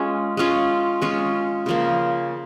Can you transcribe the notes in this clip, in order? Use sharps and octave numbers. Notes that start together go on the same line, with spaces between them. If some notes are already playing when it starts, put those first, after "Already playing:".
Already playing: G#3 C#4 F4
G#3 C#4 F4
G#3 C#4 F4
C#3 F3 A#3